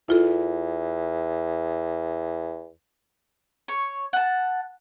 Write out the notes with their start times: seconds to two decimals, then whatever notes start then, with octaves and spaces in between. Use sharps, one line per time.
0.08 E2 E4 F4 A4
3.68 C#5 C#6
4.13 F#5 A5